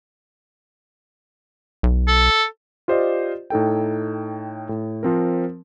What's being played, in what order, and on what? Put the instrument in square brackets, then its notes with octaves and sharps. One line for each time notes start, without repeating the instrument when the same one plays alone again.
[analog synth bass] B1
[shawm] A4
[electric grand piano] F4 G4 C5 D5 D#5
A2 D#4 A4 G5
A2
F3 C4 A#4